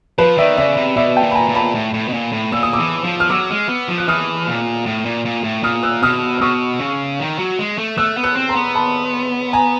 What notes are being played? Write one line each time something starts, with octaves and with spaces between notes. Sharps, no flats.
F3 B4
D#3 D5 E5
C#3 D5 E5
C3
B2 D5 E5
G5 A5
A#2
B5
G#5 A#5
A#2
A5 B5
A2
A2
B2
A#2
A2
A#2 E6
D#6
E3 D6 E6
F3
F6
F#3 D6 E6
G#3
B3
F3
F#6
E3 D#6 F6
A#2
A2
A#2
A#2
A2
A#2 D#6 F6
E6 F#6
B2 D#6 F6
E6
B2 C#6 D#6
C#3
D#3
F#3
G#3
A3
A3 E6 F#6
B3
E6 F#6
C4
A#5 C6
B3
A5 B5
G#5 A#5